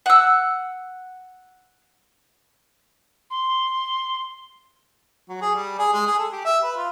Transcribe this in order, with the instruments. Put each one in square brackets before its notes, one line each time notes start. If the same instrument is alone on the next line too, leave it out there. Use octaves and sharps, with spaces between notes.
[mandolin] F#5 E6
[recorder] C6
[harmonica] F#3
G#4
G3
G#4
G#3
G#4
A4
G4
E5
B4
F4